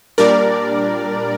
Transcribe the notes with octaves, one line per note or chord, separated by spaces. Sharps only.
A#2 G3 D4 A#4 D5